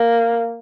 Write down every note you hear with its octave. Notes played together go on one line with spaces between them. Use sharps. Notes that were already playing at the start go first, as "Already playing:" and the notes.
Already playing: A#3